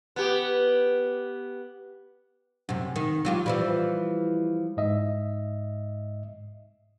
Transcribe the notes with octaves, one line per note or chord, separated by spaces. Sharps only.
B3 G4
F#2 C3
D#3
F#3 F4 G4
E3 F3 G3
G#2 D#5 E5